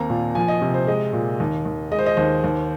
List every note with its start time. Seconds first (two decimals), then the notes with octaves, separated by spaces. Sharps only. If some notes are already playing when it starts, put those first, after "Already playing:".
Already playing: D#2 A#3 C4 A#5
0.10 A#2
0.35 F3 G#5
0.48 D#5
0.62 C3
0.74 C5
0.87 G#3 D#5
1.13 A#2
1.40 D#2
1.66 D#2
1.91 G#3 D#5
1.99 C5
2.06 D#5
2.17 D#2 C5
2.44 D#2